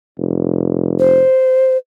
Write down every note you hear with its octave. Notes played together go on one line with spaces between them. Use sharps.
F1
C5